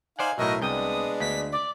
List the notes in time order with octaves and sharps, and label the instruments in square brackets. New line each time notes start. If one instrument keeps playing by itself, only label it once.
[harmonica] D#4 F5 G#5 [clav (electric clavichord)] C5 D5 F#5
[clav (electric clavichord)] B1 A2 [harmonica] F#4 A#4 E5 [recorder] D#5
[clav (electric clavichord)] C2 G5 [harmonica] G#3 B3 D4 [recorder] D#6
[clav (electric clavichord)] D2 [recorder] B6
[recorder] D5